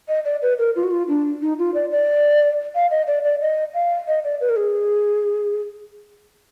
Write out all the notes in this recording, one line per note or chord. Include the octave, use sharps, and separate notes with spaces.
D#5
D5
B4
A#4
F4
F#4
F4
D4
D#4
F4
D5
D5
F5
D#5
D5
D5
D#5
F5
D#5
D5
B4
A#4
G#4